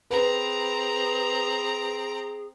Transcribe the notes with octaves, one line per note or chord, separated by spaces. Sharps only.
C4 G#4 B4 A#5